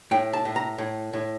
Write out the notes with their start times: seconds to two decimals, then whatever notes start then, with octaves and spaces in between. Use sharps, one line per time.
0.11 A2 G5
0.33 A5
0.45 A2
0.56 A#5
0.78 A2
1.13 A2